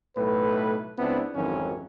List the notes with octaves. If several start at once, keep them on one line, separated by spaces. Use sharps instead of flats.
B1 A2 A3 B4
C#2 B3 C4 D4 E4
G#1 F2 D#3 E3 F#3 C#4